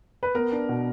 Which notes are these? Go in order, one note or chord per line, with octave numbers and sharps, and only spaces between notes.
B4
B3 A#4
D4
B2